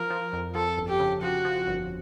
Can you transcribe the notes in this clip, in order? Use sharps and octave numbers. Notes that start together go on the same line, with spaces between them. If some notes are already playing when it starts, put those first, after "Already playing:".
Already playing: F3 A#4
F3
F2
F3 A4
G1
G4
C#3
F3 F#4
F3
G1